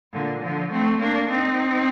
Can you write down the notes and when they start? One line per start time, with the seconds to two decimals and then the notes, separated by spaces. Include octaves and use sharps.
0.13 A#2 D3
0.43 D3 F3
0.71 A3 C4
1.00 A#3 D4
1.31 C4 D#4